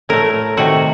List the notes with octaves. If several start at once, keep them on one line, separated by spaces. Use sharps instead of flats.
A2 A3 A#4
C3 D#3 A3 F#4